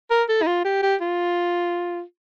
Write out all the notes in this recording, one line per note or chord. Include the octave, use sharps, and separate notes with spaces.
A#4
A4
D#4
F4
G4
G4
F4